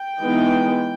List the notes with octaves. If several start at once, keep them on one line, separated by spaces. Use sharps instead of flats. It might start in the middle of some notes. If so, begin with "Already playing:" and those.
Already playing: G5
E3 G#3 B3 D#4